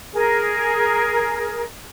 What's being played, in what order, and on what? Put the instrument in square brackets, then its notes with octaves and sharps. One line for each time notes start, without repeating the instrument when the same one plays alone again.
[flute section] G#4 A#4